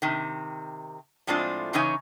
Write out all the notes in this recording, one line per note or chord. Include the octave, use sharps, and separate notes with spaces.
C3 D#3
A2 F3 G#3 C4 D4 F4
C#3 E3 C#4 D#4 C#5 G#5